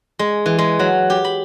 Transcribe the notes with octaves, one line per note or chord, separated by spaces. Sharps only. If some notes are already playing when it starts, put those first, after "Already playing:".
G#3
E3
G#3
F#3
G4
B5